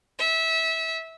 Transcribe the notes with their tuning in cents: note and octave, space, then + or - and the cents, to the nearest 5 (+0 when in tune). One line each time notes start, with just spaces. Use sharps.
E5 -20